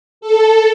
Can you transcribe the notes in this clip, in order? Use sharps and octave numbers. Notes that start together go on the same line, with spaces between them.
A4